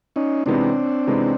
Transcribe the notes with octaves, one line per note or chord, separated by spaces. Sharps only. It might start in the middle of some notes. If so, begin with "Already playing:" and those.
C#4 D#4
C3 E3 G#3 B3 C4 D4 D#4
C3 E3 G#3 B3 D#4